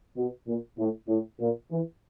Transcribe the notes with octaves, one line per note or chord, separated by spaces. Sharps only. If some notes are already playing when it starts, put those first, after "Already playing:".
B2
A#2
A2
A2
A#2
E3